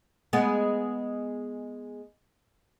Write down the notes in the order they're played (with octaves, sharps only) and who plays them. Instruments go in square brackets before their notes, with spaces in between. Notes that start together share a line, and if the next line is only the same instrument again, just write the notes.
[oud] G#3 B3